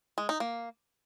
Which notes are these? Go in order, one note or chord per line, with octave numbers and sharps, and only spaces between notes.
G#3
D#4
A#3